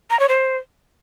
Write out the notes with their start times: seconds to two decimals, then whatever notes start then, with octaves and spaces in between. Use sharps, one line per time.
0.10 A#5
0.20 C#5
0.29 C5